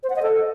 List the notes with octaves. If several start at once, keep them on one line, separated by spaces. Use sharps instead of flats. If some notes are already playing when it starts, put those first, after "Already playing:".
C5
F#5
D#5
A4